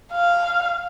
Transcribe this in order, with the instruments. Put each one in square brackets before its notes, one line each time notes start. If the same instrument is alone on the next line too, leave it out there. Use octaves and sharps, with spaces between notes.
[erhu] F5